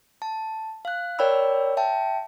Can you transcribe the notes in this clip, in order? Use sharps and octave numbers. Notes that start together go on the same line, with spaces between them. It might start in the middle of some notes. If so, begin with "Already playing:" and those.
A5
F5 F#6
A#4 C#5 D5 G5 B5 E6
E5 G5 A5